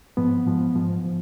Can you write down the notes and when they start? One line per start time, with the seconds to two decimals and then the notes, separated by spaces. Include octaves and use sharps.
0.17 G#2 F3 B3
0.47 G#2 F3
0.75 G#2 F3
1.05 F3